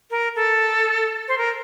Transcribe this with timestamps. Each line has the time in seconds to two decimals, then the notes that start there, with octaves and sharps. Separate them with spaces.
0.11 A#4
0.36 A4
1.28 C5
1.38 A#4